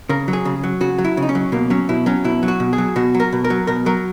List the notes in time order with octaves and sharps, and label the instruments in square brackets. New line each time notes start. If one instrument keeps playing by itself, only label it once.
[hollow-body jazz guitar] C#3 A#4
F#3
G#4
C#3
F#3
C#3 F#4
F#3
E4
C#3
D#4
C#4
F#3
B2 A#3
F#3 C#4
B2 E4
F#3 C#4
B2 E4
F#3
F#4
B2
G#4
F#3
B2 F#4
F#3
A#4
B2
A#4
F#3
B2 A#4
F#3 A#4